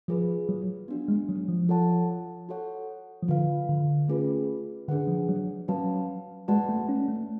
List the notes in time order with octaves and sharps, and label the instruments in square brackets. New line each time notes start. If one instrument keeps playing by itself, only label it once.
[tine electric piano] F3 [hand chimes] F4 G#4 B4
[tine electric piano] F#3
[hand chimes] B3 D4 F#4
[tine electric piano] G#3
F#3
F3
[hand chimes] F4 A4 C#5 F#5 A5
F#4 A4 C#5 F#5
[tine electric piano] F3
[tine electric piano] D3 [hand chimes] F4 B4 F5
[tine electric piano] D3
[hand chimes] A3 C#4 F4 G#4 B4
[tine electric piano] D3 [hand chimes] D4 G#4 B4 F#5
[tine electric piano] F3
F#3
[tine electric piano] F#3 [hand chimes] C#4 F#4 B4 F5 A5
[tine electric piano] G#3 [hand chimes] F#4 B4 D5 F#5 A5
[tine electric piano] A3
C#4
A3